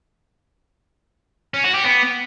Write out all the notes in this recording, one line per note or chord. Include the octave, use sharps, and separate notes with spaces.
C#4
F#4
G4
B3